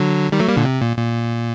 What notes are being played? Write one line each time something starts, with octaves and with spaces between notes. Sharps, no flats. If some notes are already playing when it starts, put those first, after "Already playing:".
Already playing: D3 F#3
D#3 G3
F#3 A3
G3 A#3
A#2 D3
C3
A#2
A#2